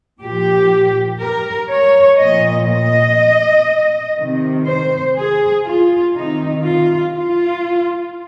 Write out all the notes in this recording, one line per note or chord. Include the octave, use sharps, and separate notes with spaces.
A#2 F3 G4
A#4
C#5
A#2 F3 D#5
D#5
C3 D#3
C5
G#4
F4
C3 D#4
D#3
F4
F4